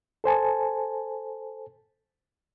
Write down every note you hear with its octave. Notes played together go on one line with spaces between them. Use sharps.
A4 C5 G#5 A5